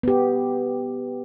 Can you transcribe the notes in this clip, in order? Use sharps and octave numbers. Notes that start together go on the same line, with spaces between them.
B3 G4